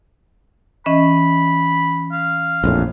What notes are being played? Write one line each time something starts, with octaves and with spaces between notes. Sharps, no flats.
E3 C#4 D#5 B5
F5
A#1 F2 A2